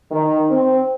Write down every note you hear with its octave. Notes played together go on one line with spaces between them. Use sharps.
D#3
C4